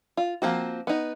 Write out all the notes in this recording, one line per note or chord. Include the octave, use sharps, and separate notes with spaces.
F4
F3 A#3 C4 F#4
B3 D#4